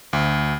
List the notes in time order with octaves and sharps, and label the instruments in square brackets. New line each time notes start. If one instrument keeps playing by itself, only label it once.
[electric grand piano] D2